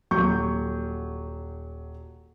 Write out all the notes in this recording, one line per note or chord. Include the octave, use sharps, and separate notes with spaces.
D#1 F#3 C#6 G6